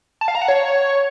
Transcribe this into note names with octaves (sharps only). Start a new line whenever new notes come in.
A5
F5
A#5
F#5
C#5